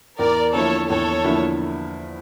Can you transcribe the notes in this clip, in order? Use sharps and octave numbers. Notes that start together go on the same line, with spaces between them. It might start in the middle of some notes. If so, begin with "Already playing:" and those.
E2 A#4 D5
D3 F3 A#3 E4 A4 C#5
E2 A4 C#5
D3 F3 A#3 E4